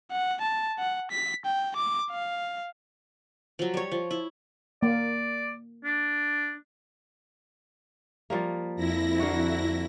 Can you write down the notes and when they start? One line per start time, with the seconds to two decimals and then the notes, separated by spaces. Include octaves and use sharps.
0.12 F#5
0.42 A5
0.79 F#5
1.11 B6
1.46 G5
1.76 D6
2.11 F5
3.59 F3 F#3
3.74 G3 C#5
3.92 F3
4.11 E4
4.83 A#3 D5
5.84 D4
8.30 F3 G3 A#3
8.76 F2 E4 A#6
9.20 D3 A#3 F#4